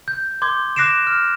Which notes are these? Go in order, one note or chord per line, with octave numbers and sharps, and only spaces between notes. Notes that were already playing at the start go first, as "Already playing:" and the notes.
G6
C6 D6 G6 G#6
D6 F#6 A#6 C7 D7 E7
F6